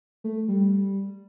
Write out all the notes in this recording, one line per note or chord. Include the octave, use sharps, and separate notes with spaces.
A3
G3